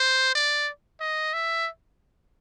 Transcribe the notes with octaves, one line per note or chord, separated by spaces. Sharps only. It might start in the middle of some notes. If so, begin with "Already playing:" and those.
Already playing: C5
D5
D#5
E5